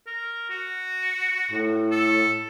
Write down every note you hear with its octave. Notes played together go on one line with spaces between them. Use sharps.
A#4
F#4
A2
A4